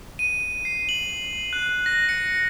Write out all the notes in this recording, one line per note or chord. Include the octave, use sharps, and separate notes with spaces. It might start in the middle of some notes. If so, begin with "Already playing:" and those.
D#7
C7
F#7
F#6
A#6
C#7